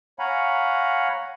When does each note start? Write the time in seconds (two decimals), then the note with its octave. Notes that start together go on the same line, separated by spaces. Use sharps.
0.19 C#5 F5 F#5 G#5 A#5 B5